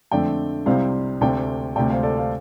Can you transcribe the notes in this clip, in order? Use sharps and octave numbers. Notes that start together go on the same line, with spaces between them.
F2 D3 A3 C4 D5 G5
C2 C3 G3 C4 C5 F5
D2 C3 A3 C4 D5 G5
D2 C3 A3 D5 G5
C5 F5
A4 D5
C5 F5